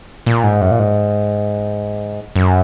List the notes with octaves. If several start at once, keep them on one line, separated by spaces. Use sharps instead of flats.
A#2
G#2
F#2
A#2
G#2
F#2